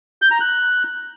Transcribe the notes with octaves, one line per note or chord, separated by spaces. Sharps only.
G6
A#5
F#6